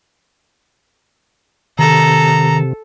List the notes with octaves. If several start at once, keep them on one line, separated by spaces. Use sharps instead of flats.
C3 D#3 A4 A#5